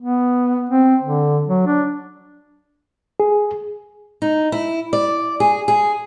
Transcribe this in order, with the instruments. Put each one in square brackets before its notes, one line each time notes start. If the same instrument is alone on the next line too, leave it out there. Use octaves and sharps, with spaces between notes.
[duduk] B3
C4
D3
F#3
D4
[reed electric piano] G#4
[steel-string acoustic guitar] D#4
E4
D5
G#4
G#4